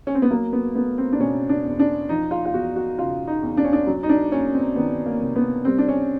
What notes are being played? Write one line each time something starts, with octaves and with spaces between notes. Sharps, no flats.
C#4
C4
B3
F#3 A#3
B3
A3 B3
C4
D4
B2 C#4
D4
E2
D4
F3 D#4
F4
F4
E2 F#4
F#4
C#3 F4
D#4
E2
D4
C#4
D4
F#3
D#4
D4
A#3 C#4
C4
D#3 B3
A#3
C3
B3
G3 C4
D4
C#4